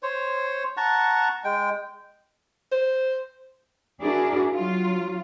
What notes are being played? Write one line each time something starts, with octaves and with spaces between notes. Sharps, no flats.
C5 C#5
F#5 A5 A#5 C#6
G#3 G5
C5
D4 E4 F#4 G#4 A#4 D5
F#3 F4